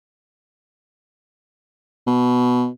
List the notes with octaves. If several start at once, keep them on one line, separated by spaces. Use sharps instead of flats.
B2